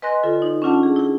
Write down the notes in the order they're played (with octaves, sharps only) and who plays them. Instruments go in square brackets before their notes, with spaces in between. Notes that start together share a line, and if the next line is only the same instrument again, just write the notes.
[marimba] B4 D#5 G#5 C6 F#6 A#6
D3 F4 A4
D#4
C#4 D4 F4 F#5 A5
G#4
E4 G#4